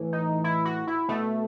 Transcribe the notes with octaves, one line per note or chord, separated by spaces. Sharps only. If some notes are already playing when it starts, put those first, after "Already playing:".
Already playing: A2 E3
D#4
E4
F#4
E4
B2 A3